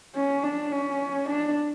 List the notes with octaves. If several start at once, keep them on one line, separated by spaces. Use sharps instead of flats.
C#4
D4
C#4
D4